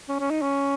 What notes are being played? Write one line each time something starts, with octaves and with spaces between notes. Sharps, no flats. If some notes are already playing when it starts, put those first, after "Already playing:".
C#4
C#4
D#4
C#4